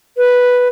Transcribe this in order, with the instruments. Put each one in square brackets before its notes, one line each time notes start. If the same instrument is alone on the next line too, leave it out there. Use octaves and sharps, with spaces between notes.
[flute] B4